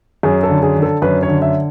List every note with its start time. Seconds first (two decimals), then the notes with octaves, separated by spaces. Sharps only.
0.23 F#2 G#4
0.43 A4
0.50 D3
0.62 G#4
0.76 D3
0.82 A4
1.02 F#2 B4
1.23 C#5
1.29 D3
1.42 E5